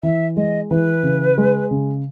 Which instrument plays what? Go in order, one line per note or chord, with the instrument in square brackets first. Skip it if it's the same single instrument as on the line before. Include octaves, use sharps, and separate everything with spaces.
[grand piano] E3 [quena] E5
[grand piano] G#3 [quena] D#5
[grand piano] E3 [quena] B4
[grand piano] C#3
G#3
C#3